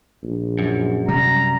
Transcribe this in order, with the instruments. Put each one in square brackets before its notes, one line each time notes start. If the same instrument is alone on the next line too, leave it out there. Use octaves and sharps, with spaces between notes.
[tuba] A#1
[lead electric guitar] F#2
[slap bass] C3 G3 [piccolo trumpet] A#5